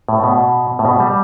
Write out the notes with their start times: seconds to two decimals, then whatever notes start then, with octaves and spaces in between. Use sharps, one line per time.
0.09 A2
0.24 B2
0.79 A2
0.85 B2
1.00 G3